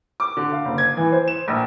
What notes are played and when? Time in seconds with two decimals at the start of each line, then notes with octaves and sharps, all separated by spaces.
0.20 D6
0.37 D3
0.52 F5
0.65 F#1
0.78 G#6
0.97 E3
1.12 C5
1.28 E7
1.48 A#1